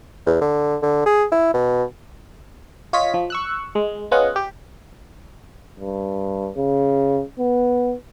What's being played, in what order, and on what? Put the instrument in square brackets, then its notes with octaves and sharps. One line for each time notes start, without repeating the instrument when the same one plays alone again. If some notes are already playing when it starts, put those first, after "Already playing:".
[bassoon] E2
D3
D3
G#4
E4
B2
[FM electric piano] F4 C#5 D#5 B6
F3
C#6 E6 F#6
G#3
B3 C#4 F4 G#4 D#5 F#5
G4
[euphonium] G2
C#3
B3